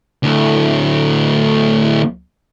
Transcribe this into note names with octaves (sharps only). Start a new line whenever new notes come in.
D2 A2